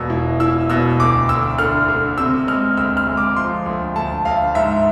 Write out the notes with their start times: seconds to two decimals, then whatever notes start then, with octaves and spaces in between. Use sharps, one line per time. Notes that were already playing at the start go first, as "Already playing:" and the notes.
Already playing: E1 B2 E6
0.10 E4
0.40 E4 E6
0.70 B2 E6
0.99 D2 D6
1.29 D2 E6
1.58 D3 F6
1.88 D3
2.18 C3 E6
2.47 G#3 F6
2.77 D2 E6
2.97 F6
3.07 G#3
3.17 D6
3.36 F3 C6
3.66 D2
3.96 D2 A5
4.25 D2 F5
4.55 G#2 E5